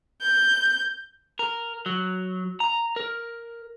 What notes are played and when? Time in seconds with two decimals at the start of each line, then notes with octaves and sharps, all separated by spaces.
0.21 G6
1.39 A#4
1.86 F#3
2.60 A#5
2.96 A#4